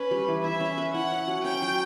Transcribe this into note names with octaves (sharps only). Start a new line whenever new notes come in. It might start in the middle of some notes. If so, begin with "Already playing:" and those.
Already playing: C#4 B4
G3
E3
E4 E5
C#4
B4
E4 F#5
C#4
F#3
C#4 G5
F#3